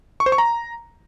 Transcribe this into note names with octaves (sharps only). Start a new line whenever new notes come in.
C#6
C5
C#6
A#5